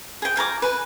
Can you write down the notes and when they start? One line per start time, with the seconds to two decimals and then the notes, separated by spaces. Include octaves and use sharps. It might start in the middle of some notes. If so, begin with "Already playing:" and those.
0.22 G#4 G5
0.36 F4 G#5 A#5 D6
0.62 B4 G#5